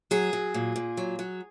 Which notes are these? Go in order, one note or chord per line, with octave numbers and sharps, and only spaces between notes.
F#3 G#4
F#3
A#2
A#2
F#3
F#3